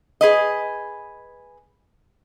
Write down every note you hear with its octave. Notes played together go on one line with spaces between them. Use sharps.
G#4 B4 D#5